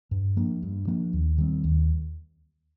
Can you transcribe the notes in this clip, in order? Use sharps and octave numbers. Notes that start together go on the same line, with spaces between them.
G2
F3 A#3 D4
G2
F3 A#3 D4
D#2
D#3 G3 C4
D#2